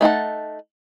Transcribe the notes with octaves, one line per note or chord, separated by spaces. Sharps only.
A3 D#4 F#5 A5